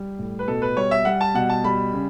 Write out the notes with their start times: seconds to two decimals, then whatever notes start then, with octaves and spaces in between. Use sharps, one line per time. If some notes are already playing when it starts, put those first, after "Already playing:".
Already playing: G3
0.19 A2
0.39 B4
0.48 B2 A4
0.62 B4
0.77 G3 C#5
0.91 E5
1.05 G3 F#5
1.21 A5
1.34 B2 F#5
1.49 A5
1.64 G3 B5
1.93 C#3